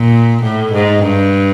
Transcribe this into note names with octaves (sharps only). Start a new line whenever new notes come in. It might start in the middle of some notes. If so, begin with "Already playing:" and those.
Already playing: A#2
A2
G#2
G2